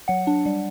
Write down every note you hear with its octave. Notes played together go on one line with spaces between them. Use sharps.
F#3 F#5
D4
G3